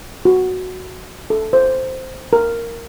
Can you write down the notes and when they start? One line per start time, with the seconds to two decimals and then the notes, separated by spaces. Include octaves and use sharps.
0.25 F#4
1.30 A4
1.53 C5
2.33 A#4